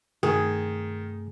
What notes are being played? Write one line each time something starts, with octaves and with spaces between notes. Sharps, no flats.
G2 C3 D#3 A3 G#4